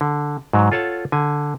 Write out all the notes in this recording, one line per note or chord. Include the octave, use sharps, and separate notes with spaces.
D3
G#2 F#3
F4 A4 C#5 F#5 A5
D3 G#5